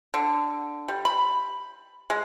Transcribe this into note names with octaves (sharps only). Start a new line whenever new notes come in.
D3
G3
B5
G#3